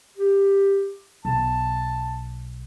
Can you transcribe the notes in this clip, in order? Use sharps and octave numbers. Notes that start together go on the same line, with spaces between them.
G4
B1 A5